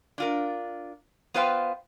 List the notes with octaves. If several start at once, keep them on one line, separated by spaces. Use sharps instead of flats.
D4 F4 A#4
B3 F4 B4 C5 F5 G5